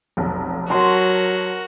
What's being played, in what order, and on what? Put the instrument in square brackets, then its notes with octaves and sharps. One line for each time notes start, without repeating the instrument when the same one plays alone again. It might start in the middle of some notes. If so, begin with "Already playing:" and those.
[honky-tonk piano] F1 B1
[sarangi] F#3 [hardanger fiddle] F#4 A#4 [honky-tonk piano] A5 [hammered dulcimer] C6